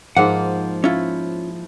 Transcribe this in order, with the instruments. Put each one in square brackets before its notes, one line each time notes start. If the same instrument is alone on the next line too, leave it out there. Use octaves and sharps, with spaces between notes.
[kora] G#2 A#3 [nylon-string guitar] F3 [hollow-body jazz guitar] F#5
[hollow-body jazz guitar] C#4 F4 [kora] E4